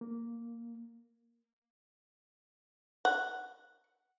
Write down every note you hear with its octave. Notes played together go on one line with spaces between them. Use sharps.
A#3
F#5